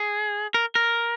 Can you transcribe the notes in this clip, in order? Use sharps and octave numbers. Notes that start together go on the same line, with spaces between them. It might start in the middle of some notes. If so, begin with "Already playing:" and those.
Already playing: G#4
A#4
A#4